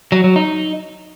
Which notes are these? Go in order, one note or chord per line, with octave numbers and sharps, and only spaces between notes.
F#3
F#3
D#4